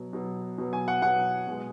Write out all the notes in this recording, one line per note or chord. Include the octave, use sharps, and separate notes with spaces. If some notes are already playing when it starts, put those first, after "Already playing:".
Already playing: B2 F#3
B2 F#3
B2 F#3
G#5
F#5
B2 F#3 F#5
B2 G#3